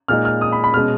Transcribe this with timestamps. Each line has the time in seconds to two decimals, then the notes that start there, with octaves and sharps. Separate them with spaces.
0.08 A#2 G#3 D#4 F6
0.25 F6
0.41 D#6
0.52 B5
0.64 B5
0.74 B2 G#3 C#4 F6